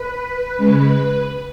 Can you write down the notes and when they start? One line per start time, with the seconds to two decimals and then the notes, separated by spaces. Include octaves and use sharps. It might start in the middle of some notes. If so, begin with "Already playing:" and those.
Already playing: B4
0.57 C#3 G#3 B4